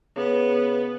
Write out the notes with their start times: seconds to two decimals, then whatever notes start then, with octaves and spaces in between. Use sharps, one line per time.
0.16 C#3 B3